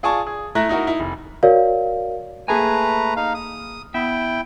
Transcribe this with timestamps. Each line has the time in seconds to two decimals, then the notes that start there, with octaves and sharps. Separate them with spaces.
0.03 F4 G#4 D5 G#5 A5 C#6
0.27 G#4
0.55 A3 E4 A#5 F#6 A#6
0.69 D#4 E4 F#4 A#4
0.87 D#4 E4
1.00 F1
1.43 F#4 A#4 C#5 D5 F5
2.48 A3 A#3 G#4 B4 G#5 A#5
3.16 D#4 F5
3.34 D#6
3.94 B3 E4 E5 G5